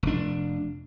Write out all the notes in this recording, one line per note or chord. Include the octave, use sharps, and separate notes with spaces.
F1 D4